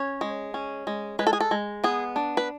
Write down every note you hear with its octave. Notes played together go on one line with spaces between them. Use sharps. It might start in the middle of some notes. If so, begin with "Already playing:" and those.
Already playing: C#4 C#5
G#3
C#4
G#3
G#3 B4
A4
G#4
A4
G#3
B3 G#4
D4
B4